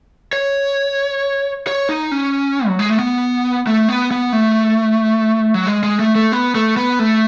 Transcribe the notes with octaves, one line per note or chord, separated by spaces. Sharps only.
C#5
C#5
D#4
C#4
F#3
G#3
A3
B3
A3
B3
B3
A3
F#3
G#3
G#3
A3
A3
B3
A3
B3
A3